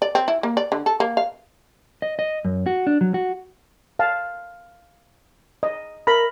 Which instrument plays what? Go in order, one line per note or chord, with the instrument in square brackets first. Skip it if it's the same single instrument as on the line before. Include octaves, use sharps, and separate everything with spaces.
[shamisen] D5
C4
E4
A#3
D5
D3
A4
A#3
F5
[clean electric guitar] D#5
D#5
F#2
F#4
D4
F#3
F#4
[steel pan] F5 A5
D#5
[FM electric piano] A#4 A#5 [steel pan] B5